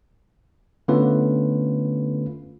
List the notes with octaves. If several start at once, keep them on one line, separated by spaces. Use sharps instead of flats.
D3 A3 B3 C#4 F4 B4